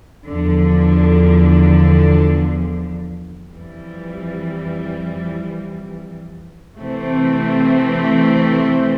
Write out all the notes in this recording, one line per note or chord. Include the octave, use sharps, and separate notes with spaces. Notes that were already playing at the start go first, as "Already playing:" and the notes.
E2 D3 F3
F2 E3 G3
C3 E3 A3 C4